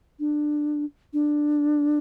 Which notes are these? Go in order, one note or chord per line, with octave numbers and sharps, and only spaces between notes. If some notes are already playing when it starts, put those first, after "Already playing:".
D4
D4